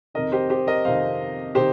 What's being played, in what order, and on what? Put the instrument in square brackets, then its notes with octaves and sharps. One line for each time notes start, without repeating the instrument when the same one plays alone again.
[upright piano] F2 C3 D#3 A#4 D#5
G4 C5
G4 C5
A#4 D#5
F2 C3 D#3 C5 F5
C3 D#3 G4 C5